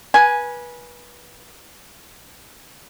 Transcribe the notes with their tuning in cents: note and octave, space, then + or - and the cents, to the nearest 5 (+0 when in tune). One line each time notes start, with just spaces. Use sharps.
B4 -25 G#5 +0